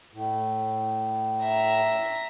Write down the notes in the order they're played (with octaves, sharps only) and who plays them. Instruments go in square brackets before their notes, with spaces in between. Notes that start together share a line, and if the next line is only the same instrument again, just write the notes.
[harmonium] A2
[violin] E5 A#5